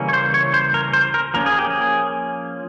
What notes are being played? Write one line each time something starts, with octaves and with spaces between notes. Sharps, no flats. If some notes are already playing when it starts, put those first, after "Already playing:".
Already playing: C#3 E3 G3 A#3 C#4
C#5
C5
C#5
C5
A#4
C5
A#4
F3 A#3 C#4 A#4
G#4
G4
G#4